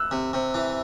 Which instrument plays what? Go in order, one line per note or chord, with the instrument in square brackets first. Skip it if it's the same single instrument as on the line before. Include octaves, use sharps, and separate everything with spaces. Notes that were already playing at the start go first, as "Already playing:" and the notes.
Already playing: [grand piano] E6 F#6
[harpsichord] C3
C3
E3